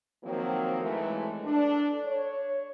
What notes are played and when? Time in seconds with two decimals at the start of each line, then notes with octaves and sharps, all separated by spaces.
0.23 D#3 F3 F#3 A#3 C4
0.82 G#2 E3 G#3 A3
1.44 D4 A4
2.05 C#5